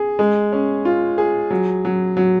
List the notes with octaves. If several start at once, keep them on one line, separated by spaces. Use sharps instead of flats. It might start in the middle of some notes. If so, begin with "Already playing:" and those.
Already playing: G#4
G#3
C#4
F4
G#4
F#3
F#3
F#3